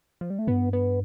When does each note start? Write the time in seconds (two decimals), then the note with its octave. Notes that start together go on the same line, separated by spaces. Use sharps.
0.21 F3
0.30 G3
0.39 A3
0.47 G2 B3
0.73 B3